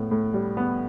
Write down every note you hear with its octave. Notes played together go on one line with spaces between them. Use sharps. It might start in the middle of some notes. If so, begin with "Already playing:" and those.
Already playing: A2 B3
A2
G3
B3